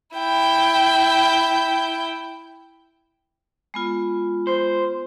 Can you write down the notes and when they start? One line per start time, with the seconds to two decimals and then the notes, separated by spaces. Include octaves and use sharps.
0.17 E4 G5
3.74 G#3 B3 F4
4.47 C5